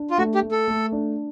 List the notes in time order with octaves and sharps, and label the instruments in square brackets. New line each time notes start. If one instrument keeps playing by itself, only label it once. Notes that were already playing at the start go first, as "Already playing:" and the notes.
Already playing: [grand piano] D4
[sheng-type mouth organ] F4
[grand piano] A3 [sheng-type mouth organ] F#4
[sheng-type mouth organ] G4
[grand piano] A3
[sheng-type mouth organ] A4
[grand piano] A3
D4